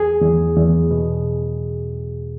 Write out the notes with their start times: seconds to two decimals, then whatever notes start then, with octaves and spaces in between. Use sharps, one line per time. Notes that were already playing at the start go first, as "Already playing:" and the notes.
Already playing: E2 G#4
0.22 E2
0.57 E2
0.91 B2